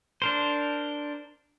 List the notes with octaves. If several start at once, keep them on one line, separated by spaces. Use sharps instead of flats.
D4 A#4 C5